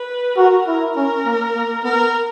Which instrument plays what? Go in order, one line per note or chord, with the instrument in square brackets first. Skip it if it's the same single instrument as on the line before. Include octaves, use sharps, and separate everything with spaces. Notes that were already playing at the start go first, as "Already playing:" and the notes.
Already playing: [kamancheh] B4
[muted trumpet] F#4 [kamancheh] A#4
[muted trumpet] E4 [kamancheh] A#4
[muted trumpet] C#4 [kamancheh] A#4
[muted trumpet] A#3
A#3
[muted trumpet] B3 [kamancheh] A#4